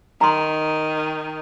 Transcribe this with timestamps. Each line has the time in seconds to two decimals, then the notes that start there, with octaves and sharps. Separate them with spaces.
0.21 D#3 A#5 C6